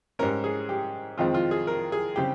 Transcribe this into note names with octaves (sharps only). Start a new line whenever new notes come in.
G#2 G3 C#4 A#4
G#4
G4
F2 D#3 G#3 C4 F4
F4
G#4
A#4
G#4
C#3 G3 C4 G4